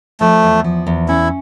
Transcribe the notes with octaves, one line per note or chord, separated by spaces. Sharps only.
F3 A3
E2
F3
E2
C#4 E4